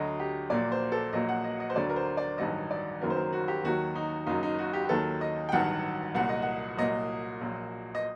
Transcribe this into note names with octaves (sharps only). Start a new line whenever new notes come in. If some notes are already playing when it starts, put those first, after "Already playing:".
Already playing: D2 D3 F#3 D#5
G4
A#1 A#2 F#3 D5
C5
A4
A#1 A#2 F#3 D#5
F#5
D#5
D#5
C5
D2 D3 F#3 D5
A#4
C5
D5
A1 G2 D#3 F#3 D#5
D5
F#1 F#2 D#3 F#3 A#4
C5
A#4
F#4
G4
D#2 D#3 F#3 F#4
D#4
F#1 F#2 F#3 D#4
D#4
F#4
G4
G4
D#2 D#3 F#3 A4
D#5
G5
A1 G2 D#3 F#3 F#5
C2 A#2 F#3 F#5
D#5
F#5
C2 A#2 F#3 D#5
A#1 A#2 F#3
D#5